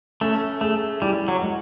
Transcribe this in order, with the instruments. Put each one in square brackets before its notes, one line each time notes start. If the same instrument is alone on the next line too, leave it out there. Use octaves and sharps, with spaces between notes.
[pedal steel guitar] A3 [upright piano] C#4
[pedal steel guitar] A3 [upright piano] G#4
[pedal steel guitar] G3 [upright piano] E4
[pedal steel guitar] F#3
[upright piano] G#3